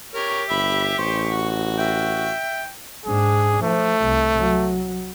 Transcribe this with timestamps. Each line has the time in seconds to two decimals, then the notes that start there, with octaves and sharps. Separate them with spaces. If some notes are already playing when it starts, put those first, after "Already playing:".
0.15 G4 A#4 C#5
0.50 G1 E5 B5
0.99 A1 C5 C#6
1.31 F#4
1.78 E5 G5
3.06 G#2 D4 G#4
3.63 F3 A3
4.04 C2
4.38 F#3